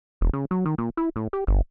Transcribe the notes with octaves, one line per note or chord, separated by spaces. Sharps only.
E1
C#3
F#3
D#3
A#2
E4
A2
G4
G1